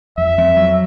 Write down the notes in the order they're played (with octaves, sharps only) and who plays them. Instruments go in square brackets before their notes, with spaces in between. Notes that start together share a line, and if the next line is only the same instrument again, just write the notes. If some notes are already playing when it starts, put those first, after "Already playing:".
[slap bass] F2 [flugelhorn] E5
[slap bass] F2
F#3